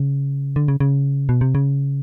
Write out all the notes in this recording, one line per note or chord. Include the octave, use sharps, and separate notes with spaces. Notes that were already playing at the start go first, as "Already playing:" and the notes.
Already playing: C#3
D3
C#3
C#3
B2
C3
C#3